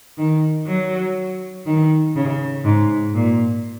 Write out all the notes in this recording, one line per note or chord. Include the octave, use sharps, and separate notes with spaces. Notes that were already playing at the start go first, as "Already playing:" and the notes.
D#3
F#3
D#3
C#3
G#2
A#2